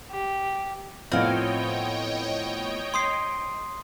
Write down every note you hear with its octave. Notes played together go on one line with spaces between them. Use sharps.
G4
A2 F3 B3 C4 C#5 D#5 F5 G5
C6 D#6 C7